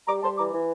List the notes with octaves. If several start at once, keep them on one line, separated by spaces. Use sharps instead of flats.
G3 A#5 D6
G3 A5 C6
E3 A#5 D6
E3